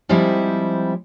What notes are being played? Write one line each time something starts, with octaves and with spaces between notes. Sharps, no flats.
F3 G3 G#3 C4 E4 G4